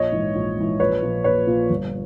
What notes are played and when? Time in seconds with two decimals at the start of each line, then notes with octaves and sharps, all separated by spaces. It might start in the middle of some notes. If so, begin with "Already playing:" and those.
Already playing: A#1 C#5 D#5
0.12 G#2 E3
0.35 A#1
0.57 G#2 E3
0.80 A#1 B4 C#5
1.02 A#2 F3
1.24 A#1 B4 C#5
1.47 A#2 F3
1.70 G1